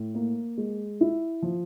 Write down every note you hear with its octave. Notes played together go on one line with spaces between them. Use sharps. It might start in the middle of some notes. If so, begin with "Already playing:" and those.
Already playing: A2
A#3
G#3
E4
F3